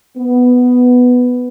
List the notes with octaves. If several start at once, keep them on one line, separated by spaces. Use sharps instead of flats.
B3